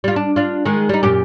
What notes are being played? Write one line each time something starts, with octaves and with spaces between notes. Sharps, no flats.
G3 F4
D4
D4 F4
D#3 G#3
G3 D#4
F#2 A#2 G4